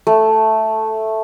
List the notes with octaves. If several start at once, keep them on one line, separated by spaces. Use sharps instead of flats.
A3